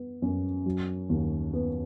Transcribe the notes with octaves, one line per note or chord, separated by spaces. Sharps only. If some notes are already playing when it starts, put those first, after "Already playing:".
Already playing: B3
F#2
F#3
D#2
B3